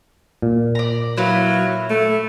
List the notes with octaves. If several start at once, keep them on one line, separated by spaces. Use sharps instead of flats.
A#2
D5 A#5
F#3 E4 B4 F5
A3